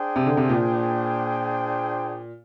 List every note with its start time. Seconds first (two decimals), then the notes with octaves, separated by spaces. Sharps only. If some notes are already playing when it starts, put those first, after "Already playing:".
Already playing: D4 G#4 C5 G5
0.16 C3
0.26 D3
0.37 C3
0.49 A#2